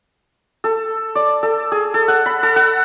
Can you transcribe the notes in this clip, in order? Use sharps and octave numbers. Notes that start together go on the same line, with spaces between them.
A4
D5
A4
G#4
A4
F#5
B5
A4
F#5